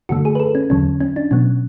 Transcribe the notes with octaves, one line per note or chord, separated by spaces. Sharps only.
F#2 D3 A3 F#4
G#4
B4
A4
C#4
E2 D3 F#3 C#4
C#4
D4
B2 F#3 B3 C#4